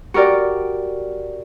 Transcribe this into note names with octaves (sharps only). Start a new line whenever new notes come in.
F#4 G4 A#4 D5